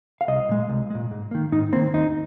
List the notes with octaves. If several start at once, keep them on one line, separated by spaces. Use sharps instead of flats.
F5
C2 D#5
A#2 G#3
C2
A#2 G#3
G#2
D#3 A#3
G#2 D#4
D#3 A#3 C4
D#2 D#4